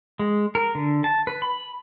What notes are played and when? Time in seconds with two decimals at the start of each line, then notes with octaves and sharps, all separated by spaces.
0.19 G#3
0.55 A#4
0.75 D3
1.04 A5
1.27 B4
1.42 B5